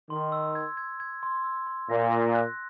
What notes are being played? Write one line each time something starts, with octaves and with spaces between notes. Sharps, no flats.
D#3 C6
E6
G#6
G#6
G#6
C6
E6
C6
A#2 A#6
A#6
F#6